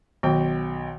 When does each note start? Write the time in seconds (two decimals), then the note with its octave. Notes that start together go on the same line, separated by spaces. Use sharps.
0.23 B1 D#3 G5